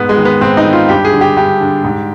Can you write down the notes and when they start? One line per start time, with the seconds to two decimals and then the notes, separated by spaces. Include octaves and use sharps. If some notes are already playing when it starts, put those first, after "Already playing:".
Already playing: G#2 B3
0.09 G#3
0.17 D#3
0.25 B3
0.41 G#2 C4
0.57 D#4
0.65 D#3
0.73 F4
0.89 G2 G4
1.05 G#4
1.13 D3
1.21 G4
1.36 G2 G4
1.61 D3
1.84 G#2